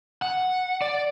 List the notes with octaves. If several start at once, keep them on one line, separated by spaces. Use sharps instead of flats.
F#5
D5